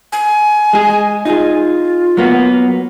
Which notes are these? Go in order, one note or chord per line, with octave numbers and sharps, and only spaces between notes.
G#5
G#3 G#4
D#4 F4 G#4
F#3 A#3 B3